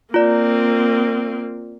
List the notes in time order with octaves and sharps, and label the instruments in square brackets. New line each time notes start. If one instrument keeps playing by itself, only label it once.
[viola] A#3 C4 [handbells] F4 D5